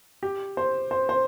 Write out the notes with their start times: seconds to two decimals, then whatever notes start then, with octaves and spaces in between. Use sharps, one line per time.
0.23 G4
0.57 C5
0.91 C5
1.09 C5